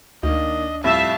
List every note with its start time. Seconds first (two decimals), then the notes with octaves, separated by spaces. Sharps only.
0.23 D2 D#3 A#3 D4 D#5
0.84 F2 A2 G3 E5 F5 A5